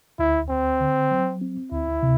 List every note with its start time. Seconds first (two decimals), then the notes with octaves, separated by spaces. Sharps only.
0.19 D2 E4
0.49 D2 C4
0.80 D3
1.11 F#3
1.41 C4
1.71 D2 E4
2.03 C3